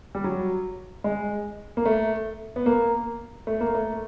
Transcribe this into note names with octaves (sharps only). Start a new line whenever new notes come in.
G3
F#3
G#3
A#3
A3
B3
A#3
A3
A#3
A3